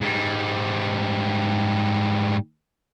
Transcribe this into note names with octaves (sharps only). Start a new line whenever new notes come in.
G#2 G3